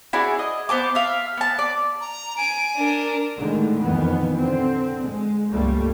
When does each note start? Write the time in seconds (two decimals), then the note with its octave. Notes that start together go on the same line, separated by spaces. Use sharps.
0.13 E4 F#4 G#4 D5
0.39 D#5
0.69 B3 C5 A5 D6
0.95 E5 F5
1.37 B3 A5
1.59 D5
2.01 A#5
2.37 G#5 D7
2.77 D4 A#4
3.37 A2 D3 D#3 G#3
3.80 F2 A#2 D#3 E3 B3
4.37 D3 C4
5.05 G#3
5.51 C#2 G2 G3 A3 A#3